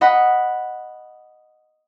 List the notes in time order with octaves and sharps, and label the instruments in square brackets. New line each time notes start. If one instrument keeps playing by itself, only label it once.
[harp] D#5 F#5 B5